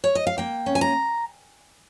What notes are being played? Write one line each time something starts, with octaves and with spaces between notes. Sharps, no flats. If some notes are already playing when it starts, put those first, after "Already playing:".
C#5
D#5
F5
A#3 G5
C#4
G#5
A#5